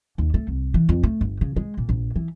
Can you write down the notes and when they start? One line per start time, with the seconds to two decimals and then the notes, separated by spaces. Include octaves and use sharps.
0.18 D#2
0.34 A3
0.48 C2
0.74 E3
0.89 F2
1.03 A3
1.21 G1
1.41 C#3
1.56 G#3
1.77 A#2
1.89 A#1
2.16 E3